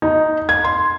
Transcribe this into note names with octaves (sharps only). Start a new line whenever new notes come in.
D#4
G#6
C6